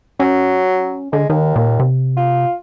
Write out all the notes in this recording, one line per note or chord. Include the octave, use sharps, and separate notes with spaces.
F#3 C#4
D3 G#3
D#2 D#3
A#2
C3
F4